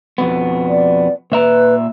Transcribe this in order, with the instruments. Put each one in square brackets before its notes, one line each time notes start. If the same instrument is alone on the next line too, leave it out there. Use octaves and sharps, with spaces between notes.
[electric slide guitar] F2 B2 B3
[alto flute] D5
[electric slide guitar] A#2 E5 A#5 [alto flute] B4